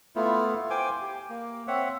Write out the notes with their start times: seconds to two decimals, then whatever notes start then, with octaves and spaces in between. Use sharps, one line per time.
0.16 A3 B3 E4 F4
0.70 C5 G5 G#5 D6
1.02 G4
1.29 A#3
1.68 C4 C#5 E5 F#5